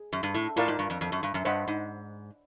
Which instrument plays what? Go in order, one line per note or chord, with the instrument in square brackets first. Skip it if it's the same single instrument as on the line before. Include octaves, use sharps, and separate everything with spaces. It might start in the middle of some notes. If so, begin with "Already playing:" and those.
Already playing: [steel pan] G#4
[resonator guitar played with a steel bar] F#2
G2
A2
[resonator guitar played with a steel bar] A2 [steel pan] F4 A#4 D5 F5 A5
[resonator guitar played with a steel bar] G#2
G2
F2
F2
F#2
G2
F#2
[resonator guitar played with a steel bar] G2 [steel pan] C5 D#5 F#5 B5
[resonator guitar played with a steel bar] G#2